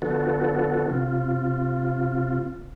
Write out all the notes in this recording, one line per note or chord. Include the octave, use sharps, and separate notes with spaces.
D3 F3 B3 F#4 A4
C3 F4